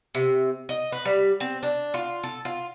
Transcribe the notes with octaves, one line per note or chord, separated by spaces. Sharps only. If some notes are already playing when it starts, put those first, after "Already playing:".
C3
D#5
B4
G3
C4
D4
F4
A4
F4